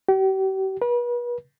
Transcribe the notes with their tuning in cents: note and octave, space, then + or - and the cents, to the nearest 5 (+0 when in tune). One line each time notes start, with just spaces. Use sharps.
G4 -40
B4 -35